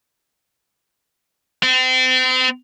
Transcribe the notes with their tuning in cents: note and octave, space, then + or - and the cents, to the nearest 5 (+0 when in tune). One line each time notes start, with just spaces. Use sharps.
C4 -35